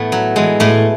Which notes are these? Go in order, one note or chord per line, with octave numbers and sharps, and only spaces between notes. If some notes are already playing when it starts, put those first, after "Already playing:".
Already playing: A2 E3 A3 B3
F#3
E3 G#3
A2 A3